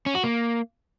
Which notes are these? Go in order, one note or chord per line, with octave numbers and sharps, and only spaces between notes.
C#4
F#4
A#3